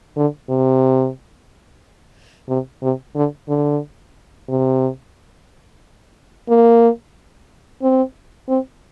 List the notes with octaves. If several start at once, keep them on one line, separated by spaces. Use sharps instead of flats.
D3
C3
C3
C3
D3
D3
C3
A#3
C4
C4